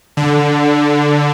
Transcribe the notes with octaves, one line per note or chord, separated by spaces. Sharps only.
D3